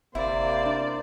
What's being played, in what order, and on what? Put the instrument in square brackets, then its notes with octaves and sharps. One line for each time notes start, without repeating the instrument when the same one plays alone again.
[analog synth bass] G1 [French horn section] C3 A#3 [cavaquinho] E4 [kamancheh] C5 D5
[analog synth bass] D4